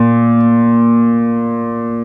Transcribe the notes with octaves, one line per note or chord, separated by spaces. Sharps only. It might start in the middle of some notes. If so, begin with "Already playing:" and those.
Already playing: A#2